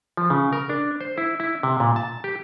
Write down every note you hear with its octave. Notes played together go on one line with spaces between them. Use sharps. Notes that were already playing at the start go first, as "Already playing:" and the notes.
F3
C#3
A#4
D4
C5
E4
E4
C3
A#2
A5
G4